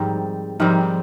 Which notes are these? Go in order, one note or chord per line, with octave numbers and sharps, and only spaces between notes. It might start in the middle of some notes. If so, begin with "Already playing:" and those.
Already playing: G#2 D#3 F3 G3 C4
G#2 D#3 F3 G3 C4